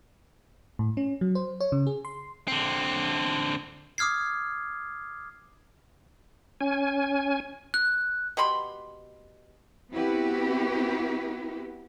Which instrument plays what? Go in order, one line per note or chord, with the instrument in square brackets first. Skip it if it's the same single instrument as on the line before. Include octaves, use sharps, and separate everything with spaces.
[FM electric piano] A2
C#4
F#3
C5
C#5
C#3
G#4
C6
[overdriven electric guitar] D3 C4
[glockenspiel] D6 D#6 F6 G#6 C7
[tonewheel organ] C#4 G#5
[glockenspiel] F#6
[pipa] B2 G4 B5 C6
[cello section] B3 C4 E4 F#4 G4 B4